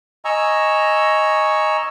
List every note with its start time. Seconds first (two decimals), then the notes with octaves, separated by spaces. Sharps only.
0.25 D#5 G#5 A#5 C#6 E6